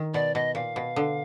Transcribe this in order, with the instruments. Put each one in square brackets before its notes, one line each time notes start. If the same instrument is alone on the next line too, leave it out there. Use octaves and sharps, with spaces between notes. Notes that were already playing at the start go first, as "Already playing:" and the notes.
Already playing: [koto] D#3
[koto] B2 [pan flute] D5
[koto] B2 [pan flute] D#5
[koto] A#2 [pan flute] F5
[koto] B2
D3